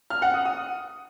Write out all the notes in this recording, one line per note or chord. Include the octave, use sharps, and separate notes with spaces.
F6
F#5
D#6
D#6